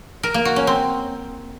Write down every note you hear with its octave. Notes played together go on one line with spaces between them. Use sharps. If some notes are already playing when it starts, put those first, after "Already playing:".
A#4
A#3
F#4
C#4
C4